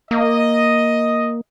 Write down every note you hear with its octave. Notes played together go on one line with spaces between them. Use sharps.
A#3 D#5